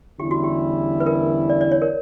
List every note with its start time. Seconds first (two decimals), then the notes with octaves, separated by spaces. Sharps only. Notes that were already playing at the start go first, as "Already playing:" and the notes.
0.20 E2 D3 G3 C#4 E4 G4
0.31 F#4
0.44 G4
1.00 B4
1.06 A#4
1.50 D5
1.61 D5
1.72 C#5
1.82 A#4